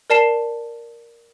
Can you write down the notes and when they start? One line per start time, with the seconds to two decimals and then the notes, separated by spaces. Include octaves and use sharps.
0.10 A#4 D5 A5 C7 E7